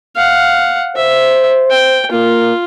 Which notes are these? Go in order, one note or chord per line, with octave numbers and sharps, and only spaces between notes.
F5 F#5
C5 E5
G5
A#3 F4